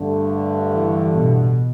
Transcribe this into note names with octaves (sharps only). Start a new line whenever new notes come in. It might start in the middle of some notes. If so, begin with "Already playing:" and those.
Already playing: G2 D3 A3
E3
B2